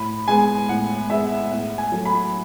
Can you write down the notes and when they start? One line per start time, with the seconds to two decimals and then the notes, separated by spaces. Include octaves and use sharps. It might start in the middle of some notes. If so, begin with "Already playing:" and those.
Already playing: A2 B5
0.28 G#3 B3 G#5
0.69 A2 F#5
1.10 G#3 B3 E5
1.51 A2 F#5
1.78 G#5
1.92 F#3 A3
2.05 B5